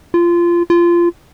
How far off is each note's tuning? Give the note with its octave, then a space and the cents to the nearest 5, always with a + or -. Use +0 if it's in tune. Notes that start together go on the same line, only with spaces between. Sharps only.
F4 -20
F4 -20